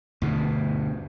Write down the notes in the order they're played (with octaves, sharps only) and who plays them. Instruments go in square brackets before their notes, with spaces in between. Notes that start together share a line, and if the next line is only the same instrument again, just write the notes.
[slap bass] D2 G2 B2